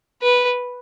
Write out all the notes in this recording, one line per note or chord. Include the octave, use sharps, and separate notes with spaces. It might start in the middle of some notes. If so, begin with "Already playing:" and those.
B4